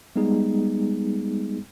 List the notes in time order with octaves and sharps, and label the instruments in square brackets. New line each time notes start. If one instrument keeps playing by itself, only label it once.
[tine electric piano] G3 G#3 B3 D#4 G#4